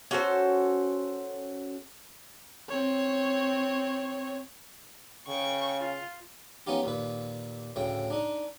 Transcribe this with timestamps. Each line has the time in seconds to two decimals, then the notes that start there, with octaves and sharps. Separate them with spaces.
0.11 C#4 F#4 A4 C5
2.69 C4 C#5
5.28 C#3 G5 C#6
5.79 F4
6.67 B3 C#4 D#4 F4 G4
6.83 D#2 A#2 B4
7.76 D2 A2 C#3 G5
8.10 D4 D#4